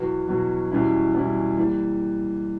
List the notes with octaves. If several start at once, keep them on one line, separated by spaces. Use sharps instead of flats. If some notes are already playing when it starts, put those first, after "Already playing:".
Already playing: E2 B2 F#3 B3 F#4
E2 B2 F#3 B3 F#4
E2 B2 G3 C#4 E4
E2 B2 G3 C#4 E4
E3 G3 A#3